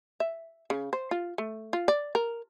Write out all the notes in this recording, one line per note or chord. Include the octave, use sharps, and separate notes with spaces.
E5
C#3
C5
F4
A3
F4
D5
A#4